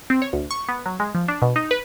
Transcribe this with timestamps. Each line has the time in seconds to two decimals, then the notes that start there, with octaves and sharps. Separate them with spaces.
0.10 C4
0.22 C#5
0.33 D2
0.51 C#6
0.69 B3
0.86 F#3
1.00 G#3
1.15 F3
1.28 D4
1.42 B2
1.56 D#4
1.71 B4